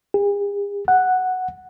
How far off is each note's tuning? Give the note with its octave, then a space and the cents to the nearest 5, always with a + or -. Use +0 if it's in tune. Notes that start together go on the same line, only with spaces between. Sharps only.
G#4 -45
F#5 +0